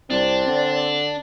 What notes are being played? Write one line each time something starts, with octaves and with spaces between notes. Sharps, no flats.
C2 C4 D4 D5
D3